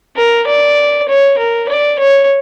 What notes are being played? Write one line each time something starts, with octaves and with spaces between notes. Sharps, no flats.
A#4
D5
C#5
A#4
D5
C#5